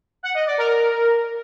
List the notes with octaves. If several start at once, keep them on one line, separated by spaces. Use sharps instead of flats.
F#5
D#5
D5
A#4